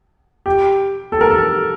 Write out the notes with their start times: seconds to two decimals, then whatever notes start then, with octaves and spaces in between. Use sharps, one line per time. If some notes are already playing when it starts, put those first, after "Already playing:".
0.46 G4
1.12 A4
1.21 A#4
1.30 A4